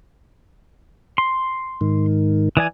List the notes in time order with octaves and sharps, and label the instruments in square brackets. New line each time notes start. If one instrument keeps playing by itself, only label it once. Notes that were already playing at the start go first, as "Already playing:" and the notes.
[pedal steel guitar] C6
[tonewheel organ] G#2 D#3
[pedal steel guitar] E3 D5 G#5 [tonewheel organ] D#6